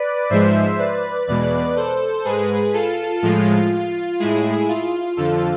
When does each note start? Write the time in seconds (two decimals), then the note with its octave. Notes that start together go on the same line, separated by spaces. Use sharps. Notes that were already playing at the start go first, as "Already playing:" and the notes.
Already playing: B4 D5
0.30 G#2 F3 G#3 C5 E5
0.79 B4 D5
1.27 E2 B2 G#3 B4 D5
1.76 A4 C5
2.25 G#2 G#3 G#4 B4
2.73 F4 A4
3.22 A2 F3 G#3 F4
4.19 A2 G#3 E4 G#4
4.68 F4
5.17 F2 D3 F3 F4 A4